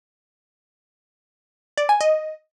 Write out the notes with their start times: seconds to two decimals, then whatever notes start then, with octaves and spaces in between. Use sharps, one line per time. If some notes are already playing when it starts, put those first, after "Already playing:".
1.77 D5
1.89 G#5
2.01 D#5